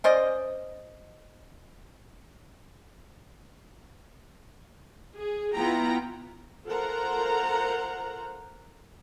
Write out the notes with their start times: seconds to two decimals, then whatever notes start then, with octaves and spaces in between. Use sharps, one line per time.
0.04 C#4 C5 D5 D#5
5.17 G#4
5.55 B3 E4 F4 G5 A#5
6.66 F4 A4 A#4 C5 F#5 A#5